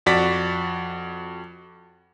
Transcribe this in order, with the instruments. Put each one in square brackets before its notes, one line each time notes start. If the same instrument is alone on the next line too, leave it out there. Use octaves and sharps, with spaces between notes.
[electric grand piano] F2 F#4 D5 A6 B6